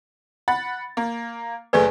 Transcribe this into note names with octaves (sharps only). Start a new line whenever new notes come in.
F#5 B5 A6
A#3
F#1 A3 G#4 B4 D5 G#5